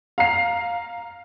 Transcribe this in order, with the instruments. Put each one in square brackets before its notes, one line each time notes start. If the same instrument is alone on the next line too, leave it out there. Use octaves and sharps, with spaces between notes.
[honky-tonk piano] F5 A#5 C7